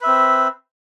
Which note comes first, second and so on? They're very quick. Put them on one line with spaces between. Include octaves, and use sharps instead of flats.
B4 E5 C4